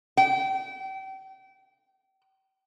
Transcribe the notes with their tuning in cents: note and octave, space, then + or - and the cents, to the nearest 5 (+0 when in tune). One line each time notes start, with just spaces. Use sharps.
G5 -35